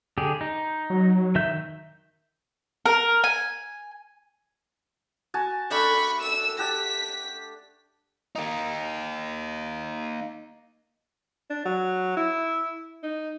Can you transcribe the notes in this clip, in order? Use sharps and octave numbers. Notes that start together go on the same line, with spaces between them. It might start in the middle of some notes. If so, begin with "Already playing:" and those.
D3 G4 G#4
D#4
F#3
D#3 E5 G6
A#4
G#5
F#4 G#5 A5
A3 D4 B5 C#6
E6 E7
G4 F#5 A5 B6
A#3 D#4
D4
F#3
E4
D#4